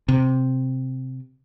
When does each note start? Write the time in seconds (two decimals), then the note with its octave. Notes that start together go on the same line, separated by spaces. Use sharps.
0.08 C3